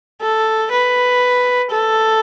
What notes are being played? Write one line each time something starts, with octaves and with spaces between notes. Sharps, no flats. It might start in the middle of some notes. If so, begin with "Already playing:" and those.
A4
B4
A4